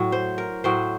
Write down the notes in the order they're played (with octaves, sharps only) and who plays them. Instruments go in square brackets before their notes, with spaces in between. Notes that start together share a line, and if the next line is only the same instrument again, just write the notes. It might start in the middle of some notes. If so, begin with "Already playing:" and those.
Already playing: [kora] A2 F#3
C5
A#4
A2 F#3 C5